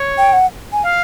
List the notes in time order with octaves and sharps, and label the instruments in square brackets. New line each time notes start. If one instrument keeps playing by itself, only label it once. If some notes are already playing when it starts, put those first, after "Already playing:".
Already playing: [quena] C#5
[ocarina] G5
F#5
G#5
[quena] F5